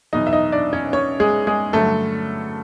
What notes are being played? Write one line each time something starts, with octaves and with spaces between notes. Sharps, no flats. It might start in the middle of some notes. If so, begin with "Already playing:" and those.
E2 B2 F#3 D#4 D#5
E5
D#4 D#5
D4 D5
C#4 C#5
C#4 C#5
G#3 G#4
G#3 G#4
G2 D3 F#3 A3 A4